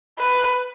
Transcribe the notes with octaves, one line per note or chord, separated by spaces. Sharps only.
B4